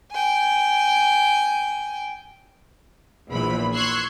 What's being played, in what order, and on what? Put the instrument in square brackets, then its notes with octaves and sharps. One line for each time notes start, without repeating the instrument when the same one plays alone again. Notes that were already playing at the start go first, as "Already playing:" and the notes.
[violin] G5 G#5
[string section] A#1 E2 E3 B5
C6 C#6 E6 F#6 G#6